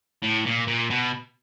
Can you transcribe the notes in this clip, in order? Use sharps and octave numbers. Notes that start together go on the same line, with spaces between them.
A2
A#2
A#2
B2